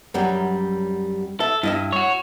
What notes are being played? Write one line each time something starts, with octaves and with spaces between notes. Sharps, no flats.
F#2 F#3 G3
A4 E5
G2 E4 D#5 E5
F#4 C#5